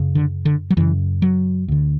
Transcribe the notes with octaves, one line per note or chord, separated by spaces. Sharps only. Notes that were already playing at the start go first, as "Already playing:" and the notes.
Already playing: F#2 C#3
D3
D3
F#3
F#2 C#3 E3
F#3
D2 D3